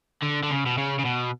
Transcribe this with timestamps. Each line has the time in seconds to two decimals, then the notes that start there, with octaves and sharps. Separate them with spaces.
0.23 D3
0.43 D3
0.51 C#3
0.66 B2
0.77 C#3
0.99 C#3
1.05 B2